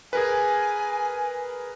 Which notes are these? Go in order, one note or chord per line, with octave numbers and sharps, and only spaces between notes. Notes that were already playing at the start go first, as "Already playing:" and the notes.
G#4 A#4 B4 G#5